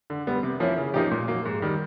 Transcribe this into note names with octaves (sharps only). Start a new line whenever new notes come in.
D3
G3 B3
C3
F3 A#3 C#4 E4
C#3
F3 A#3 D#4 G4
A#2
F#3 A#3
G#2
D#3 G3